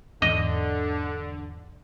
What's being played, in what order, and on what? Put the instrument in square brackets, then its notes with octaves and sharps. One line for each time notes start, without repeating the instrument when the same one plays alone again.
[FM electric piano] E2 G#2 [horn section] D3 [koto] D#5